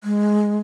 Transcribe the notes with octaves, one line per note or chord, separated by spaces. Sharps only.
G#3